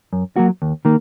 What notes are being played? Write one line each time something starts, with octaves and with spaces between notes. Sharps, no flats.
F#2
F#3 A#3 F#4
D#2
D#3 A#3